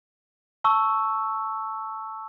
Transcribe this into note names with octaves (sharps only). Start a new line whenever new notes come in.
A5 C#6 E6